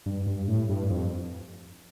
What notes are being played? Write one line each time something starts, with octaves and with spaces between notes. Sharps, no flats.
G2
G2
A2
G2
F2